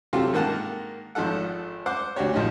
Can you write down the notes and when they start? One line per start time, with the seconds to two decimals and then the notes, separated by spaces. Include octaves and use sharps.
0.13 C3 F#3 C4 F4 G4 A4
0.33 G#2 D#3 A#3 A#4 F#5 A5
1.15 G#1 F3 D#4 A4 F#5
1.86 C5 F#5 D6
2.16 D2 D4 F#4 G4 C#5
2.33 A#1 F3 G3 D#4 F#4